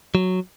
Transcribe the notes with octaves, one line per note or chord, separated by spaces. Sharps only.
F#3